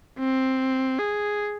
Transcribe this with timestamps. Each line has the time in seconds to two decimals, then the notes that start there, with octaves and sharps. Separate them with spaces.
0.19 C4
0.99 G#4